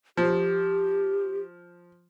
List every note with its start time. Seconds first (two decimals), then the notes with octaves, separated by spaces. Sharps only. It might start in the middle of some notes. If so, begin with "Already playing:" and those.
0.17 F3 G4